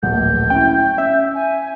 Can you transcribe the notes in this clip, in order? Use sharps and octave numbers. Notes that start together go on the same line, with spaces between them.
D1 A#1 F#5 G6
C#4 E4 G5
C#4 E5
G#5